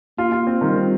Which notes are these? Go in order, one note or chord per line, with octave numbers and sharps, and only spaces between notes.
A#3 F4
F4
C4
D#3 G3
C4